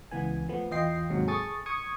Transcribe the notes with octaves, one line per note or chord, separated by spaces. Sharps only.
C#2 E3 B3 G#5
F3 A3 B3
E2 F4 D#5 G5 C7
D#2 G#2 C3 F#3
G#4 A4 C#6 D#6 A6
C#6 D#6 G#6 C#7